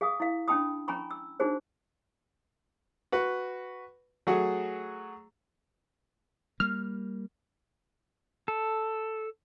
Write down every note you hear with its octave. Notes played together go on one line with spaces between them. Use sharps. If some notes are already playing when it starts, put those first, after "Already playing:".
G#4 F5 G#5 D#6
E4 F5
C#4 D4 G5 A5 B5 D#6
C#4 G#5 A#5 B5 C#6
E6
D4 D#4 F#4 G#4 C5
F#4 B4 C#6
F#3 A3 F#4 G#4
G3 A#3 F6
A4